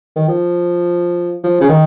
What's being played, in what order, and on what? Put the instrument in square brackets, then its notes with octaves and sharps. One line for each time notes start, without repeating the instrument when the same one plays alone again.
[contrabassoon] D#3
F3
F3
C#3
D#3